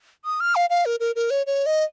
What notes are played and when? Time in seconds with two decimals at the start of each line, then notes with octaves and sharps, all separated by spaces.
0.25 D#6
0.40 F6
0.55 F5
0.70 F5
0.86 A#4
1.00 A#4
1.16 A#4
1.30 C#5
1.46 C#5
1.66 D#5